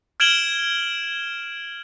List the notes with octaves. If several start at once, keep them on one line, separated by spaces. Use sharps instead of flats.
F6 G#6 D7 E7 F#7 G7